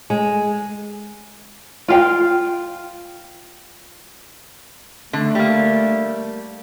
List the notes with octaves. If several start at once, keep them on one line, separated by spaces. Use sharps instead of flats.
G#3
F4 F5 G5
D3 A3
G3 A#3